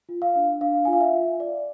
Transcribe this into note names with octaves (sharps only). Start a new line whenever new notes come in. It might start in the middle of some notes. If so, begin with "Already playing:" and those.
F4
F5
D4
D4 F5
F4 G#5
F5
E5
F4
D5